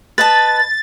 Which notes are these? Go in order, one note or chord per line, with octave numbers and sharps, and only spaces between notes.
B4 D#5 A5 A6